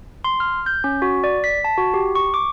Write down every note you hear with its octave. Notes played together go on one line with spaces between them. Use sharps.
C6
F6
G6
C#4
F#4
D5
B6
A5
F#4
G4
C#6
D6